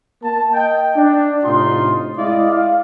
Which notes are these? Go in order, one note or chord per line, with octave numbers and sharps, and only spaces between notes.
A#3 A#4 A5
D#5 G5
D4
A2 C3 D#4 F4 C6
G#3 E4 D5 D#5 F5
F5